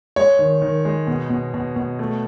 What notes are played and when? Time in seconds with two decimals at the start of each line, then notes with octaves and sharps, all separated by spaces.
0.16 G#3 C#5
0.39 D#3
0.62 D#3
0.85 G#3
1.07 B2
1.30 B2
1.54 B2
1.76 B2
1.99 A3